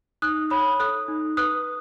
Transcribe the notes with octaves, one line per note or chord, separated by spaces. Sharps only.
D#4 D#6 F#6
C#5 B5 D#6
A4 D#6 F#6
D#4
B4 D#6 F#6